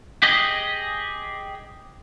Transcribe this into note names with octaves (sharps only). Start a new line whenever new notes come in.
G4 G#4 D#5